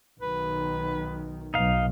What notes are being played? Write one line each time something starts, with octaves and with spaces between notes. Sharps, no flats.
B1 D#3 B4
B1 D#4 F5